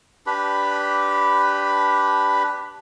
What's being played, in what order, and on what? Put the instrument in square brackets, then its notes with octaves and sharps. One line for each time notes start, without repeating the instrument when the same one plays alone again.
[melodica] D4 G4 B4 B5